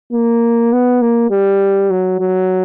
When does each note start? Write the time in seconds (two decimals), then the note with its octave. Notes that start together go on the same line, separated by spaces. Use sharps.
0.13 A#3
0.73 B3
1.02 A#3
1.30 G3
1.90 F#3
2.20 F#3